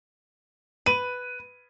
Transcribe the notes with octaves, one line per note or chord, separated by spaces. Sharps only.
B4 D#7